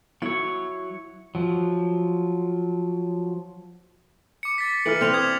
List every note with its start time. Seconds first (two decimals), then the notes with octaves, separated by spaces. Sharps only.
0.22 F#3 E4 C#5
1.35 F3 F#3
4.43 D6 C#7
4.58 A6 B6
4.86 E3 A#4 B4 F6 F#7
5.01 C4 D4 B4 F6 F7
5.13 D#6 F6 G#6